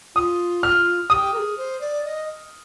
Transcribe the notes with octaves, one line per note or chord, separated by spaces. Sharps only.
F4 D#6
F6
G4 D#6
A#4
G#4
C5
D5
D#5